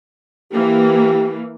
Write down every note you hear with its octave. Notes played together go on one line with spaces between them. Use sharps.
E3 A#3 G4